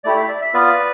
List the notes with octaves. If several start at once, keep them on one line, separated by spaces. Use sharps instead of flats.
A3 E4 G4 D5
E5
D5
E5
B3 F4 B4 D5